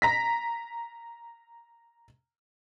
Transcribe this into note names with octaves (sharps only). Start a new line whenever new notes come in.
A#5 A#6 B6